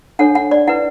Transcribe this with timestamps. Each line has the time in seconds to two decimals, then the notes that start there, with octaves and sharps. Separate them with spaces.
0.19 D4 A4 C#5 F#5
0.35 F#5
0.51 D5
0.68 E4 B4 F#5